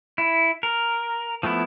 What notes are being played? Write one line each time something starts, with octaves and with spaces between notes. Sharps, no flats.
E4
A#4
F3 A3 B3 E4